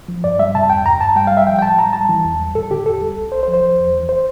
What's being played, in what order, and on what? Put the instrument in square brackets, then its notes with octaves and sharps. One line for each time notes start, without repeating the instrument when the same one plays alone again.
[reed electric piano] F3
G2 D5
G3 E5
C3 A5
E2 G5
G2 A#5
G2 A5
G3 G5
G3 F5
E5
F3 G5
G5
A2 A5
G3 A#5
G3 A5
E3
E2
G3
A2 A4
D3 G4
E2 A4
G3
C2
C2 C5
C5
F3
C5
F3
E2
E3
C5